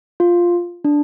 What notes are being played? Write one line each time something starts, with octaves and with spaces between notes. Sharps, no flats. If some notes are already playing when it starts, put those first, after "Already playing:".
F4
D4